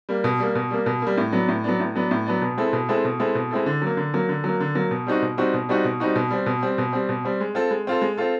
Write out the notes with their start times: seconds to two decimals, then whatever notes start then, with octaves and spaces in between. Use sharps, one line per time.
0.09 G3 A#3
0.24 B2
0.40 G3 A#3
0.55 B2
0.71 G3 A#3
0.86 B2
1.02 G3 A#3
1.17 A2
1.33 F#3 B3 D4
1.48 A2
1.64 F#3 B3 D4
1.80 A2
1.95 F#3 B3 D4
2.11 A2
2.26 F#3 B3 D4
2.42 B2
2.58 G#3 C4 E4 A4
2.73 B2
2.89 G#3 C4 E4 A4
3.05 B2
3.19 G#3 C4 E4 A4
3.35 B2
3.51 G#3 C4 E4 A4
3.66 D3
3.82 F#3 A#3
3.97 D3
4.14 F#3 A#3
4.29 D3
4.44 F#3 A#3
4.60 D3
4.75 F#3 A#3
4.91 B2
5.07 G3 C4 D#4 F#4
5.22 B2
5.37 G3 C4 D#4 F#4
5.54 B2
5.69 G3 C4 D#4 F#4
5.85 B2
6.00 G3 C4 D#4 F#4
6.16 B2
6.31 G3 C4
6.46 B2
6.63 G3 C4
6.78 B2
6.93 G3 C4
7.09 B2
7.25 G3 C4
7.40 G#3
7.55 C4 F4 A4
7.71 G#3
7.87 C4 F4 A4
8.02 G#3
8.17 C4 F4 A4